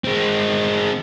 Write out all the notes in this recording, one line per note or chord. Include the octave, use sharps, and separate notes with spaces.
G#3 C4